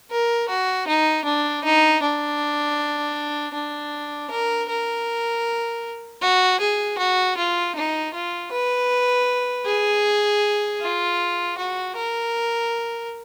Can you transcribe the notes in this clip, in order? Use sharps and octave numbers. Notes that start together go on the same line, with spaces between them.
A#4
F#4
D#4
D4
D#4
D4
D4
A#4
A#4
F#4
G#4
F#4
F4
D#4
F4
B4
G#4
F4
F#4
A#4